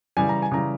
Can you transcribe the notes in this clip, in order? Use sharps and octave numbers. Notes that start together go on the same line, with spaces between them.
C#3 E3 G3 G#5
A#5
G#5
C#3 E3 G3 A#5